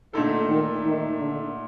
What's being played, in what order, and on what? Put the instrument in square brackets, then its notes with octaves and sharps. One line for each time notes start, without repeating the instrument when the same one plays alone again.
[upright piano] A#2 A3 D#4 A4 [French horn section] D3
[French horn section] D#3
D#3
D3